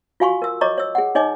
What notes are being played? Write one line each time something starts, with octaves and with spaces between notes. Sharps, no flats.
F4 F#4 F5 G#5 C6 C#6
A#4 E6
C#5 D#5 A#5 C#6 D6
C#5 E6
G#4 F#5
D#4 C#5 D#5 G#5 D6